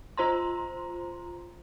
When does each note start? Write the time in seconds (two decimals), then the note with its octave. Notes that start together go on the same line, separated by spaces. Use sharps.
0.17 F4 C5 A#5 C6